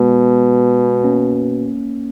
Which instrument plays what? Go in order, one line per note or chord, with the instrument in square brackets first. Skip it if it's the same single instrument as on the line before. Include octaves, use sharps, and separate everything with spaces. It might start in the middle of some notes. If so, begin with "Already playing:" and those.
Already playing: [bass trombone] B2 [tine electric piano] G#3 B3
[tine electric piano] A#3 C#4